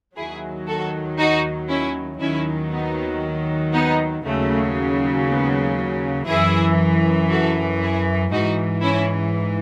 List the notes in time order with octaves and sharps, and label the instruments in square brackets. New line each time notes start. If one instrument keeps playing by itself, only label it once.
[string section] D#2 D#3 F#3 E4 G#4
F#4 A4
D#4 F#4
C#4 E4
D#2 D#3 F#3 C#4 E4
B3 D#4
B3 D#4
D#2 C#3 F#3 A3
G#3 B3
F#2 E3 E4 G#4
F#4 A4
E4 G#4
G#2 E3 D#4 F#4
C#4 E4